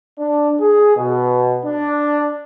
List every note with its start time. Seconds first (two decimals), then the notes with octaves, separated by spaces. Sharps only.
0.19 D4
0.61 G#4
0.97 B2
1.65 D4